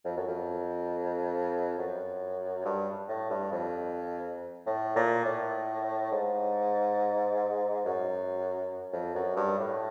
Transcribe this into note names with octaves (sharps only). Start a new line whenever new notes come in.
F2
F#2
F2
F#2
G2
A2
G2
F2
A2
A#2
A2
G#2
F#2
F2
F#2
G2
A2